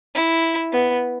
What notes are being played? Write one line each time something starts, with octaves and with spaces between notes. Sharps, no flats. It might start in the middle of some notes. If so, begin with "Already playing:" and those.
E4
B3